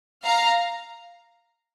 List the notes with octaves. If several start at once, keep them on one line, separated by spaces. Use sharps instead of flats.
F5 A#5